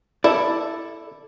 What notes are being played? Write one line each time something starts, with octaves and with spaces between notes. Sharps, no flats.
E4 A4 D5